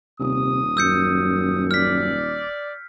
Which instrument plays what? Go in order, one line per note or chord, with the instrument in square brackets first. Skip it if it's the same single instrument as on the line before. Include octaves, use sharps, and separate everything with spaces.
[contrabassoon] D#1 [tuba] C3 [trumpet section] D#6
[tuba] F#2 [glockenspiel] E6 G6 C#7
[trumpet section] D5 [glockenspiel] F6 B6